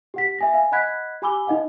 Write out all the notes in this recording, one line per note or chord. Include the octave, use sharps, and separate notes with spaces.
G4 F#5 B6
E5 G#5 A#6
F5 G#5
D#5 F#5 B5 F#6 G#6 B6
G4 G#5 B5 D6 E6 G7
D#4 D#5 F5 F#5